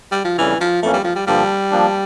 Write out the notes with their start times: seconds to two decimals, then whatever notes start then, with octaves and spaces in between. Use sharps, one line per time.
0.12 G3
0.25 F3
0.38 F2 C#3 E3 G3 C#4
0.60 F3
0.82 F2 E3 A3 A#3 C#4
0.93 G3
1.04 F3
1.16 G3
1.27 G2 D3 F3 G3 A#3
1.71 F3 A#3 D4